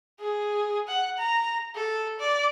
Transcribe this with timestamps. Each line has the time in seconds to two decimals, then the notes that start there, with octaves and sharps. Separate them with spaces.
0.20 G#4
0.88 F#5
1.18 A#5
1.75 A4
2.19 D5